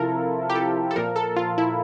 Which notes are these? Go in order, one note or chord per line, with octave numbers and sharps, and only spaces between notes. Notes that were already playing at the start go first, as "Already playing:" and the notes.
Already playing: C3 F3 E4 F4 A4 A#4
G4
A4
A4
A#2 F3 A#4
A4
F4
E4